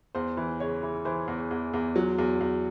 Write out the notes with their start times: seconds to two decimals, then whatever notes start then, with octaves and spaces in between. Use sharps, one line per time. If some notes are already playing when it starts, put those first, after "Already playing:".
0.15 E2 C5
0.37 E3
0.60 C#3 C#5
0.83 E3
1.05 E3 C5
1.28 E2
1.51 E2
1.74 E2
1.96 F#3
2.18 E2
2.41 E2